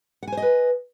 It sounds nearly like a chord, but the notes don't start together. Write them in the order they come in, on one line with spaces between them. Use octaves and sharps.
F#5 G#5 C5 D#5 B4